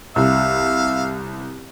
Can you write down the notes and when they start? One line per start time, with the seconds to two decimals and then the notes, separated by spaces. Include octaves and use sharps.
0.16 C2 E5 F5